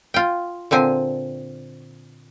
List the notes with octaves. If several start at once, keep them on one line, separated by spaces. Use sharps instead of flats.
F4 G5
A#2 D3 C4 G#5